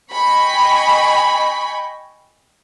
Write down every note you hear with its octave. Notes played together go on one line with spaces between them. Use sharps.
D#5 G5 G#5 B5 C#6